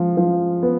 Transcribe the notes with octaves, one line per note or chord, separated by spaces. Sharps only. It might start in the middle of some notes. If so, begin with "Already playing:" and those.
Already playing: F3 G#3
F3
B3